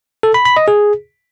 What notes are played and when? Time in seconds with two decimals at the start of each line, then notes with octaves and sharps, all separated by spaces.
0.23 A4
0.34 B5
0.45 B5
0.57 D#5
0.68 G#4